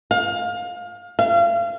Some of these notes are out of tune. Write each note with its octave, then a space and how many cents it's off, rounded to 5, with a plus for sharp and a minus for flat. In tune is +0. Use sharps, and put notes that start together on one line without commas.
F5 +25
F5 -35